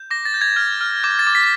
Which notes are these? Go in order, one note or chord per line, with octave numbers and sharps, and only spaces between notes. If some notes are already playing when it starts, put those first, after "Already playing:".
Already playing: G6
D6 A#6
A6
G6
G#6
F6 G#6
F6
D6 G6
A6
D6
B6